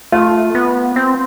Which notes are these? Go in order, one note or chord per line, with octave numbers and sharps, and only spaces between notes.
A3 F4
B3
C4